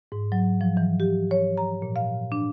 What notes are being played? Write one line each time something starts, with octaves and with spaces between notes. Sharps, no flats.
G#2
F#3
F3
E3
G4
C#5
A#5
A#2
F5
D4